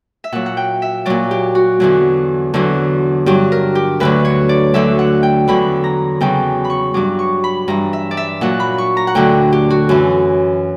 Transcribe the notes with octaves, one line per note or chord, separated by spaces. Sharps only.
E5
A#2 F#3 F#5
F#5
G5
E5
A#2 F#3 D5
G4
F#4
E2 D3 F#3
E2 D3 F#3
G2 F#3 G4
A#4
G4
D2 D3 F#3 B4
C#5
D5
D2 D3 F#3 E5
F#5
G5
E2 D3 F#3 B5
A#5
E2 C#3 F#3 G5
B5
C#6
G2 F#3 D6
C#6
B5
G2 E3 A#5
E5
D5
E5
A#2 F#3 F#5
B5
C#6
A#5
F#5
D2 D3 F#3 G5
G4
F#4
F#2 E3